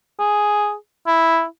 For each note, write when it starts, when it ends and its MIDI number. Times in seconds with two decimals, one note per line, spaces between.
0.19 0.75 68
1.07 1.45 64